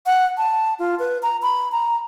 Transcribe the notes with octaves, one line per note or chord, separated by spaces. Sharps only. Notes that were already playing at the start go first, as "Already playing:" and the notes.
F#5
A5
F4
B4
A#5
B5
A#5